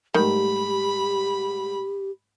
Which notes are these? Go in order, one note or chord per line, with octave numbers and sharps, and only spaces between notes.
G#2 D#3 G3 A3 G4 B5